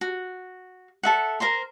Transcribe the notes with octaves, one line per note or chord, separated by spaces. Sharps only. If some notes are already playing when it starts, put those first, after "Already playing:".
F#4
A4 E5 F#5
A#4 C5 A#5 C6